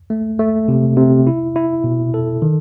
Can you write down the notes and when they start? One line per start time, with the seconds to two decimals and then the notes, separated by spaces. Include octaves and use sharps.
0.10 A3
0.39 A3
0.68 C3
0.97 C3
1.27 E4
1.56 E4
1.84 B2
2.14 A4
2.42 D#3